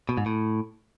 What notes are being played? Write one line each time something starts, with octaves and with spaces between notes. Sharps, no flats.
B2
G#2
A2